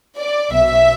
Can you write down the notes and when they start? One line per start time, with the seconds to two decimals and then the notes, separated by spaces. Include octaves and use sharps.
0.18 D5
0.52 B1 B2 E5